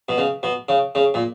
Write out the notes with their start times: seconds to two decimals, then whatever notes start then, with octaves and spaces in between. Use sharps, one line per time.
0.09 B2
0.18 C#3
0.43 B2
0.69 C#3
0.95 C#3
1.14 A#2